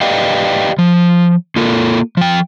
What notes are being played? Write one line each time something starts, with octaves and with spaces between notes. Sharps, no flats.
G4 B4 D5 D#5 F5 G5
F3
A#3 F4 A4 A#4
F3 G5